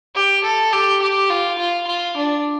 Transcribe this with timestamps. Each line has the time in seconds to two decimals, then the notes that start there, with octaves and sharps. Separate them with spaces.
0.15 G4
0.44 A4
0.72 G4
1.02 G4
1.30 F4
1.58 F4
1.87 F4
2.17 D4